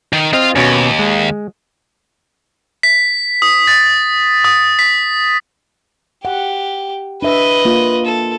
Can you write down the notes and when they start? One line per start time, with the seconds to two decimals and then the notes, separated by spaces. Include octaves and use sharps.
0.13 D#3
0.33 C4 F4 D#5 F5
0.56 D#2 B2 C#4
0.99 G#3
2.83 B6
3.42 D#6
3.67 A6
4.44 D#6
4.79 B6
6.25 G4 F#5
7.22 D4 B4 D#5 E5
7.65 A#3 F4
8.06 A4